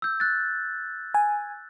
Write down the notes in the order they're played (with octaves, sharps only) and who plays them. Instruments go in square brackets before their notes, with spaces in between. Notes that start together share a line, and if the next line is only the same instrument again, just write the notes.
[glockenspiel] E6 G6
F#6 A6
[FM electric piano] G#5